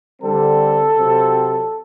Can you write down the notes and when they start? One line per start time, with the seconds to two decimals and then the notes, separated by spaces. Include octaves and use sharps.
0.22 D3 G3 C4 A4
0.96 C3 F#3 C4